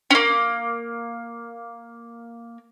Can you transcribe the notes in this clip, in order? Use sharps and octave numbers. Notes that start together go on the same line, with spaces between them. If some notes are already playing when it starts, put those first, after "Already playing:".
A#3 C#4